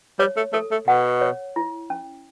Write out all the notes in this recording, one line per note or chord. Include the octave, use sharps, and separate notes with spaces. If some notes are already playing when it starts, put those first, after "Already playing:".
G3 C#5
A3
A3 A4
A3
B2 F#5
C#5
E4
C#4